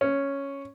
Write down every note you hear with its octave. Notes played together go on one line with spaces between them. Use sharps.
C#4